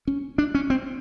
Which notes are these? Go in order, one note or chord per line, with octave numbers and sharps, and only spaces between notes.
C#4
D4
C#4
C4